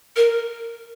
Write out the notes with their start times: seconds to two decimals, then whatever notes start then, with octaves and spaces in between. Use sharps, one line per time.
0.17 A#4